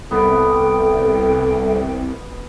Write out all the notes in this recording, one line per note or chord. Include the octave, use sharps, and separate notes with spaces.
C2 B3 A4 G5